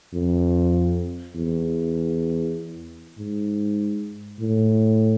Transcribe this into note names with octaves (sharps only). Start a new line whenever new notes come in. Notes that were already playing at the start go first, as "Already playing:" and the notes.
F2
E2
G#2
A2